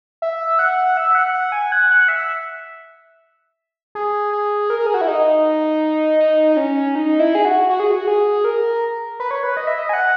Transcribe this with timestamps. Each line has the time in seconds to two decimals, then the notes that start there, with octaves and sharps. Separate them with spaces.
0.22 E5
0.59 F#5
0.97 E5
1.15 F#5
1.34 F#5
1.52 G#5
1.72 F#5
1.91 F#5
2.08 E5
3.95 G#4
4.33 G#4
4.70 A#4
4.80 A#4
4.87 G#4
4.94 F#4
5.01 E4
5.08 D#4
6.20 D#4
6.52 D#4
6.57 C#4
6.95 D#4
7.20 E4
7.35 G#4
7.45 F#4
7.70 F#4
7.80 G#4
7.91 F#4
8.08 G#4
8.44 A#4
9.20 B4
9.31 C#5
9.43 B4
9.57 D#5
9.67 E5
9.79 D#5
9.89 G#5
9.93 F#5